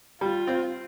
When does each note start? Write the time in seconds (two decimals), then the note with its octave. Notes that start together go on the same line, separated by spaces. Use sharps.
0.21 G3 F4
0.47 C4